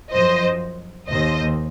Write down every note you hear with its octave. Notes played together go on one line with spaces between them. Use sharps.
F#2 F3 C5 D#5
D#2 C5 D#5